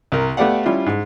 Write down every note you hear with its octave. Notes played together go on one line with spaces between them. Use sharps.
C2 A#4
A3 B3 G4 D5 F5 F#5
G3 C#4 E4 F4
G#2